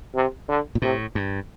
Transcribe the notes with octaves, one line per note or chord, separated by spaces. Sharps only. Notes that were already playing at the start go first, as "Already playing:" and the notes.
C3
D3
A#2
A2 C3
G2